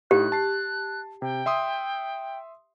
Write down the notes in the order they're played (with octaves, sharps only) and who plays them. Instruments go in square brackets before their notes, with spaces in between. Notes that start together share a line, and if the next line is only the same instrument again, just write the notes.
[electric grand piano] A2 D#4 [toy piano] G4 [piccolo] F#6
[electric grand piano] A5 C7
[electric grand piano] C3 [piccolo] G5
[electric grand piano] E5 C6 D#6